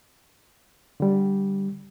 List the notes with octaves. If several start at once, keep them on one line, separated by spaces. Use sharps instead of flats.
D3 G3